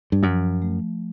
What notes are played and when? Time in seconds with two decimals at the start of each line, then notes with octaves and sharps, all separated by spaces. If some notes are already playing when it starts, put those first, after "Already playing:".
0.12 G2
0.23 F#2 F3
0.62 A3